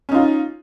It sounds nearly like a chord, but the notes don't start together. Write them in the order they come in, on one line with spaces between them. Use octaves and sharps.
C#4 D#4 F4